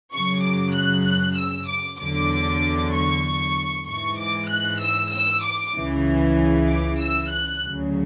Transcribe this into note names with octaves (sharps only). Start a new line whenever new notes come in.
F#2 C#3 F#3 C#6
D6
F#6
F#6
E6
D6
E2 D3 F#3 D6
C#6
G#2 E3 C#6
D6
F#6
E6
E6
D6
C#2 C#3 E3
D6
E6
F#6
D2 C#3 F#3